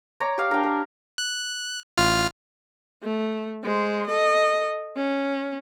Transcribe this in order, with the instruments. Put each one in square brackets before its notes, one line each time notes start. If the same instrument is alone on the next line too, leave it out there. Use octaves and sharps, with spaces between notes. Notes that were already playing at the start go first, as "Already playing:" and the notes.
[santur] C#5 D5 A#5
G4 F5
[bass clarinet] D4 [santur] A#4 G5
[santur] A#4
[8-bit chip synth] F#6
A1 F4 F6
[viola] A3
G#3 C5
A4 D#5
C#4